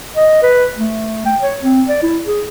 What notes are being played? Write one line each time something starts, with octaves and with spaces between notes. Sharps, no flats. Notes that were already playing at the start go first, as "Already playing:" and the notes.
D#5
B4
A3
G5
C#5
C4
D5
E4
G#4